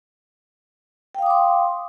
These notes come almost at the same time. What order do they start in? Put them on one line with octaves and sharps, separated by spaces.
G5 F5 D#6 D6 C6